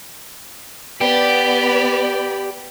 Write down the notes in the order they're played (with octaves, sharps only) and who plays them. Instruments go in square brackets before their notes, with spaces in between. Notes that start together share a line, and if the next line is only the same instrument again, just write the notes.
[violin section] B3 D5 B5 [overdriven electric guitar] G4